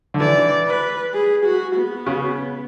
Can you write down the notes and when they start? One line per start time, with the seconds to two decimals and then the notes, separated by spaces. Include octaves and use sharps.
0.14 D3
0.20 E3 D5
0.67 B4
1.14 G#4
1.45 F#4
1.76 B3
2.06 C#3